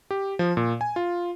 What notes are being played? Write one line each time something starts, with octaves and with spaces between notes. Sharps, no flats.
G4
F3
A#2
G#5
F4